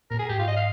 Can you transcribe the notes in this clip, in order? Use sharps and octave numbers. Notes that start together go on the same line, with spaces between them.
A#2 A#4
G#4
G#2 G4
F4
D#5
F5